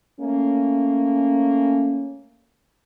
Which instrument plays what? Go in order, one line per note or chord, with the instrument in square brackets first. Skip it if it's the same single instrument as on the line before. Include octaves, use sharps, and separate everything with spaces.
[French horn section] A3 A#3 C#4